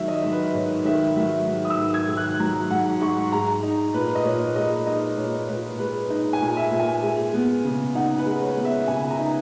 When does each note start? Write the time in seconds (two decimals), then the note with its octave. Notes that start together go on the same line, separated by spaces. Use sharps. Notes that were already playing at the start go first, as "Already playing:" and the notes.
Already playing: D#3 F#3 E5
0.08 D#5
0.24 G#2
0.32 B4
0.54 G#2 C#5
0.85 D#3 E5
1.16 F#3 E5
1.47 G#2
1.65 D#6
1.70 E6
1.78 G#2
1.94 G#6
2.09 D#3
2.17 F#6
2.40 F#3 A#5
2.70 G#2 F#5
3.01 G#2 C#6
3.32 G#3 A#5
3.63 D#4
3.94 A#2 B4
4.15 D#5
4.25 A#2 C#5
4.56 G#3 D#5
4.87 D#4 D#5
5.17 A#2 C#5
5.48 A#2 B4
5.79 G#3 B4
6.10 D#4
6.33 G#5
6.41 A#2
6.57 E5
6.71 A#2
6.80 G#5
7.02 G#3
7.34 B3
7.64 C#3
7.95 D#4 F#5
8.18 B4
8.26 G#3
8.42 C#5
8.57 B3
8.65 E5
8.88 C#3 G#5
9.11 A#5
9.19 D#4